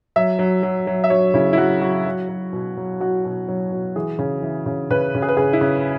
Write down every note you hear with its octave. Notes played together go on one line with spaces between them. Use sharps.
F#3 E5
F#3
F#3
F#3
E5
F#3 C#5
C#3 E4
E4
F#3 F#4
F#3 F#4
F#3
F#3
B2
F#3
F#3 F#4
B2
F#3
B2
E3 G#4
C#3
E3
C#3
C#3 B4
C#3
G#4
B4
C#3 G#4
E4
C#3